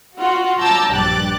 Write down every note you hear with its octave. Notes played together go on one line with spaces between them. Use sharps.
F4 F#4 F#5
A5 A#5 D6 E6 G6
A#1 G2 G4 D6 F#6 A6